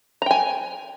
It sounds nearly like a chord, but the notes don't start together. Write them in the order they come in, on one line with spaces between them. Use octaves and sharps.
A#5 G5 G#5